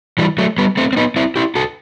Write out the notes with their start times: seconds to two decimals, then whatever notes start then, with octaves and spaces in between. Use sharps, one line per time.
0.18 E3 G3
0.38 F#3 A3
0.58 G3 B3
0.77 A3 C4
0.93 C4
0.97 B3 D#4
1.16 C4 E4
1.36 E4 G4
1.55 F#4 A4